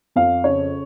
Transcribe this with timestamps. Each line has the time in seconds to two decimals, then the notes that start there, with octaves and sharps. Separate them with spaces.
0.16 F2 F5
0.44 C#3 C#5